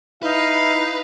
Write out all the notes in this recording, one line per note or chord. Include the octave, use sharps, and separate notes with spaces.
D#4 E4 B4 F5